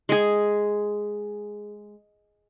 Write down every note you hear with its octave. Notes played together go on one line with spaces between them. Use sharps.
G#3 G#4